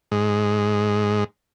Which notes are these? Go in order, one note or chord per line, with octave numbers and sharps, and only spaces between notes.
G#2